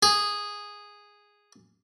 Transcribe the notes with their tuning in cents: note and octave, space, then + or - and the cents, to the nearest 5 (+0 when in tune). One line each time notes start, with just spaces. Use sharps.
G#4 -10